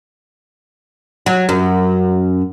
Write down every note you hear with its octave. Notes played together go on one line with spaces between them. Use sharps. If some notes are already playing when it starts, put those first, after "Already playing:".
F#3
F#2